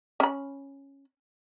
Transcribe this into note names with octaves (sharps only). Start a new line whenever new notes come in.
C#4 B5